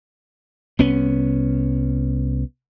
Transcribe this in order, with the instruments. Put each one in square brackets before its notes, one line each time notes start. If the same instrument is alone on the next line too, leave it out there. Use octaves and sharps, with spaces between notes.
[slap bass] C2 B3 C#4